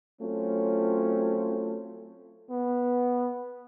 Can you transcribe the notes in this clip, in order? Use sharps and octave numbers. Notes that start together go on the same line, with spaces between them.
F#3 A3 C4 C#4 F4
B3